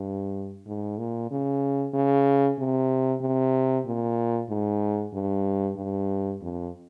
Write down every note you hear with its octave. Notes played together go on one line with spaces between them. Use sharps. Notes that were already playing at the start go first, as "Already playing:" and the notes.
Already playing: G2
G#2
A#2
C#3
C#3
C3
C3
A#2
G#2
G2
G2
F2